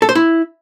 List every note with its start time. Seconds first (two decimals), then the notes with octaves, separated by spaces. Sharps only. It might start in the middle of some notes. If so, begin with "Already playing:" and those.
0.02 A4
0.09 C5
0.15 E4